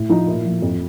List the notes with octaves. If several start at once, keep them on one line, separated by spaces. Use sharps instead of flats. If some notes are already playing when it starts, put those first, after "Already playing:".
Already playing: A2
F3 D#4
A#2 E4
F3
F2